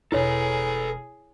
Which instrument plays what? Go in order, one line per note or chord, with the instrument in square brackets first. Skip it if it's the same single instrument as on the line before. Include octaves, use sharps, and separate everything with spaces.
[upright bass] E1 [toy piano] E4 C#5 [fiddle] G#4 [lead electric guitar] A4 B4